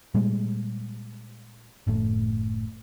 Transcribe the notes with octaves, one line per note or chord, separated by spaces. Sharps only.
A#2 G3 G#3
F#1 A2